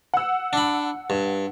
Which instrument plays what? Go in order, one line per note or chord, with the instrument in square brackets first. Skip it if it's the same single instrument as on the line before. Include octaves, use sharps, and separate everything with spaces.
[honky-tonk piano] F#5 E6
[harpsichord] D4 B5
G2